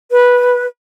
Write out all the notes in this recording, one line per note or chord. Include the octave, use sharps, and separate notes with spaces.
B4